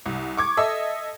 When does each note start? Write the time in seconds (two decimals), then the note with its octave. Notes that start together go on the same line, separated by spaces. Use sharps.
0.06 C2
0.37 C#6 D6 G#6
0.57 A4 D#5 E5